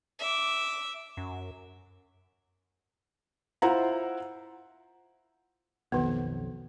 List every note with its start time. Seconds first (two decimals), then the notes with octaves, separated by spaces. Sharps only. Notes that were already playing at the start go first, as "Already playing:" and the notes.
0.19 E5 D6
1.17 F#2
3.62 E4 F4 C5 E5 F#5 A#5
5.92 B1 F2 D#3 B3